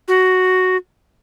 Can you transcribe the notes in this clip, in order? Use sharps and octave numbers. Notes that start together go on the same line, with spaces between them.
F#4